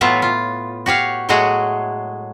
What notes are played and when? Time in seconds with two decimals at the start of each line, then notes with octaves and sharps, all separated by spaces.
0.01 A2 E3 F#3 B3 F4 E5
0.22 F4
0.86 F#4 G4 C#5 F5
1.29 A2 F#3 G#3 A3 F#4 G#4